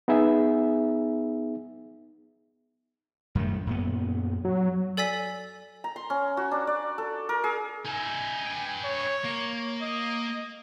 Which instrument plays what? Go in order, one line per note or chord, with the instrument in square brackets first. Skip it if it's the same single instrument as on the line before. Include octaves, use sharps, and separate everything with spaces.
[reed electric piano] B3 D#4 G#4 E5
[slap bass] F#2 D#3 A3
F#2 A#2 B3
[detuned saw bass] F#3
[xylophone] A4 D5 G#5 E6 B6
[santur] A#5
C6
C#4
F#4
D4
D5
A4
A#4
G#4
[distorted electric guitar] D#4 E5 [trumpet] G#5
[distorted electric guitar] B4 G5
[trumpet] C#5
[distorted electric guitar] A#3
[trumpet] D#5